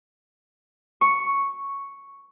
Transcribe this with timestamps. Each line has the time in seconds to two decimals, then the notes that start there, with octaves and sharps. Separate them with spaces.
1.01 C#6